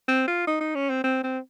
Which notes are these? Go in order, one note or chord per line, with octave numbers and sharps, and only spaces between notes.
C4
F4
D#4
D#4
C#4
C4
C4
C4